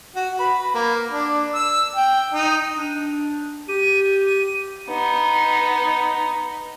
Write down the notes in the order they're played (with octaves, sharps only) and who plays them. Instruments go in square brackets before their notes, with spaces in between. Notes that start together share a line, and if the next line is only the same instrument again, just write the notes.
[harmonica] F#4
B4
A#3
D4
E6
G5
D#4
[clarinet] D4
[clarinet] G4 [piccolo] D#7
[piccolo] D#7
[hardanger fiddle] B3 D#4